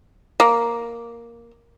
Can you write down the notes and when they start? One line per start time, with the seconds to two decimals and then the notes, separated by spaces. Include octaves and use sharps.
0.40 A#3